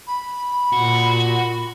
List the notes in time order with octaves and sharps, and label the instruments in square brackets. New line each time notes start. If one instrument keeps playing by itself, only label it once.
[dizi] B5
[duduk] A#2 [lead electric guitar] F#4